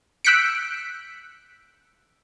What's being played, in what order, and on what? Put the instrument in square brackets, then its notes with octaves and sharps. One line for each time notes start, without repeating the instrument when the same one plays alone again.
[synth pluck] E6 F#6 G6 B6 C#7 D7